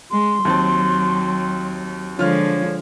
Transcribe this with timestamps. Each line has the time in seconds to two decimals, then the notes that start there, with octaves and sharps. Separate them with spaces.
0.11 G#3 C6
0.45 D#2 F#3 C4 A5
2.19 D3 F3 G#3 F4 C#5 F6